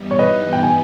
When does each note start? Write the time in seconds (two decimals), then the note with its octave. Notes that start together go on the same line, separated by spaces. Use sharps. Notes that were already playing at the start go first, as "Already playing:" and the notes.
Already playing: G2 E3 G3 B3 D#4
0.11 C#5
0.19 B4 D#5
0.53 G5
0.63 G#5